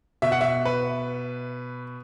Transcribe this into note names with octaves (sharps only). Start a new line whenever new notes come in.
B2 E5
F#5
E5
B4